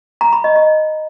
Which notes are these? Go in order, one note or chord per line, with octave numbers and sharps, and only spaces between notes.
A#5
B5
D#5
D#5